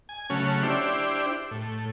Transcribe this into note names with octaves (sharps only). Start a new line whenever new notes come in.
G#5
C#3 F#3 A3 C#4
D4 E4 G4 C5
A2